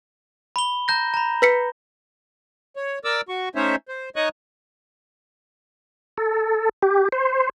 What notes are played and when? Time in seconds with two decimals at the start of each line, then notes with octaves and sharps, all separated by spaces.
0.56 B5 G7
0.88 A#5 G6 A#6
1.14 A#5 B5
1.42 B4 B6 C#7
2.76 C#5
3.04 A#4 D5 D6 E6
3.29 F#4 C#6
3.55 A3 C#4 D#4 C5 C#5 E5
3.88 C5
4.16 D#4 C#5 D#5 C#6 D#6 F#6
6.18 A4
6.82 G4
7.12 C5